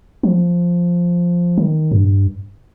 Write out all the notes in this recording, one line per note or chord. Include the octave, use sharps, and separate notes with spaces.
F3
D#3
G2